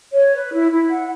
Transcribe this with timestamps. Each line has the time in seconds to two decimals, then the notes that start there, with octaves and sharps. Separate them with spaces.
0.13 C#5
0.32 B4
0.52 E4
0.71 E4
0.90 F#5